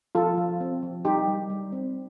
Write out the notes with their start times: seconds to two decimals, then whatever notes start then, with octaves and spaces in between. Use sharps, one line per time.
0.15 F3 F4 A4
0.37 F3
0.60 C4
0.82 F3
1.05 G3 D#4 G4
1.28 G3
1.50 G3
1.72 C4